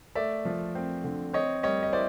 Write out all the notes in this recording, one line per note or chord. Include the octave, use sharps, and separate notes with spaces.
A3 D5 E5
F3
C4
D3
C4 C#5 D#5
G3 C#5 D#5
D#5
E4 C5 D5